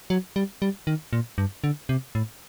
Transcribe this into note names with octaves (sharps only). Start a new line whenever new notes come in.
F#3
G3
G3
D#3
A#2
G2
D3
C3
A2